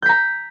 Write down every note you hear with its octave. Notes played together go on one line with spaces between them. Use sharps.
A#5 G6 B6